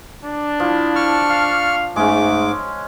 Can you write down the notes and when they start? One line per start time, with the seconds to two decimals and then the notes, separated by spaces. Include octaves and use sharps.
0.24 D4
0.60 F3 E4
0.95 C#6 F6
1.29 F5
1.96 G#2 G#3 A3 C#4 D6